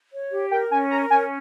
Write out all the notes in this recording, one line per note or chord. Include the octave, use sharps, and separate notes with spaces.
C#5
G4
A#4 G5
C#4 G#5
A#4 A#5
C#4 G#5